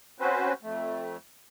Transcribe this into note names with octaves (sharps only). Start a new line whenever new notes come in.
C4 C#4 F#4 B4 C5
F2 A3